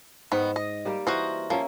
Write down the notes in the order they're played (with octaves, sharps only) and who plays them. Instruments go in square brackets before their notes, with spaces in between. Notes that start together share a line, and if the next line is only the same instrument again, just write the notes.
[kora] G#2 [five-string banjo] D#3 B3
[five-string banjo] D#5
[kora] G3 A#3 G4
[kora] E3 D#5 [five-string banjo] F#4 A#4 C5
[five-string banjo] F3 [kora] A#3 C#4 E5